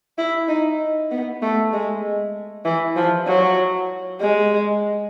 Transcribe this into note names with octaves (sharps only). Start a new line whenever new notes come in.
E4
D#4
B3
A3
G#3
E3
F3
F#3
G#3